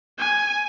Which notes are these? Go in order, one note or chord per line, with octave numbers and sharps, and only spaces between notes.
G#5